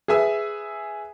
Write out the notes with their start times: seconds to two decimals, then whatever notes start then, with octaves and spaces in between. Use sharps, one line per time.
0.08 G#4 B4 E5 G#5 E6